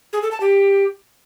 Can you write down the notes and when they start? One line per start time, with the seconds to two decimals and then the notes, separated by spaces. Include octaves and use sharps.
0.13 G#4
0.22 A4
0.31 A5
0.40 G4